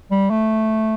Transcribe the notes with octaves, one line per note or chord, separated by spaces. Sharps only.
G3
A3